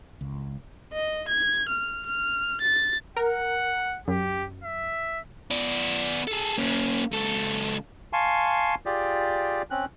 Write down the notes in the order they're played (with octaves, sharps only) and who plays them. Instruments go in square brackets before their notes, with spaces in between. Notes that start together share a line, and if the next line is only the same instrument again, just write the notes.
[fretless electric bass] C#2
[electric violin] D#5
G#6
F6
F6
A6
[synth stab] A#4 [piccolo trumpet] F#5
[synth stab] F#2 [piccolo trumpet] G4
[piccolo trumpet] E5
[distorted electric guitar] B3 D5
G#4 A4
A#3 C#4
C#2 A4
[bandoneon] F5 G#5 A5 C6 C#6
F4 G4 G#4 D5
C4 C#4 F#6